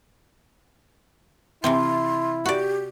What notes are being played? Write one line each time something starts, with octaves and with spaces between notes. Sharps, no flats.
C3 E3 C4 E4 C6
F#4 G4 D5